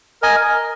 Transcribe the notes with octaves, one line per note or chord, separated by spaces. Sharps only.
A#4 D#5 G#5